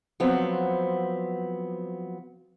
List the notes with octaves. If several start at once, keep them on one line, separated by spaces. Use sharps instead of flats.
F3 F#3 B3 C4